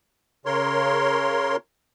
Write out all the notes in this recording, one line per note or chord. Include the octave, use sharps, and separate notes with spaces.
C#3 A#4 C#5 C6